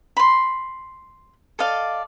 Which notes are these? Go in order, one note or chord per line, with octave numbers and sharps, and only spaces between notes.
B5 C6
A4 D5 D#5 F5